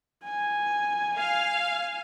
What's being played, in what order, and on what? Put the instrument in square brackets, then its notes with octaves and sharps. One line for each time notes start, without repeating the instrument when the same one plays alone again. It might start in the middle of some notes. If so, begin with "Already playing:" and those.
[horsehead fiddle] G#5
[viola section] F5